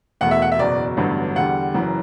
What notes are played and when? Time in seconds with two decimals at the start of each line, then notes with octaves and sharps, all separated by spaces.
0.21 E1 E2 B2 A3 F#5
0.31 E5
0.42 F#5
0.52 E5
0.59 F#1 E2 B2 D5
0.97 A1 G2 D3 F#3 B3
1.36 E2 D3 G3 F#5
1.74 F#1 F#2 E3